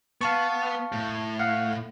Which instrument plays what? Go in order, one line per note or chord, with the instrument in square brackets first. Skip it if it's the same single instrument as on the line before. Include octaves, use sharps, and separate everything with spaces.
[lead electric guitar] B3 [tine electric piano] F5 A5 C#6
[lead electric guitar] A2
[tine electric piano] F5 F#5